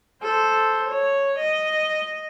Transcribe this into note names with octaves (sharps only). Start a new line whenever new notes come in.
A4 C5
C#5
D#5